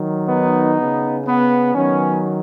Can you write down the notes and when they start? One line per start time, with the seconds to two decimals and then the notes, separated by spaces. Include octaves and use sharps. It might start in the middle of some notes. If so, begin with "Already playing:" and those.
Already playing: D#3 F#3
0.28 B3 D#4
0.77 C#3 B3
1.26 B3
1.75 D#3 F#3 B3 C#4